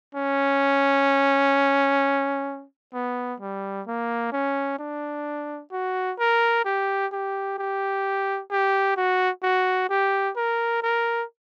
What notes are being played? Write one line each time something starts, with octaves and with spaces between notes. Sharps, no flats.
C#4
B3
G3
A#3
C#4
D4
F#4
A#4
G4
G4
G4
G4
F#4
F#4
G4
A#4
A#4